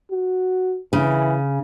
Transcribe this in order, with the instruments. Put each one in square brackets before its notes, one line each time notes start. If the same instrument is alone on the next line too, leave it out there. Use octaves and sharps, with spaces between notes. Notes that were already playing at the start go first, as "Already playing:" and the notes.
[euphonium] F#4
[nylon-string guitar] C#3 [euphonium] E3